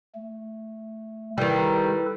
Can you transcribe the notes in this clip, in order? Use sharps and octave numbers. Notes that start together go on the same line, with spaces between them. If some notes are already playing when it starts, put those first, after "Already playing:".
A3
D#3 G3 E4 A4 B4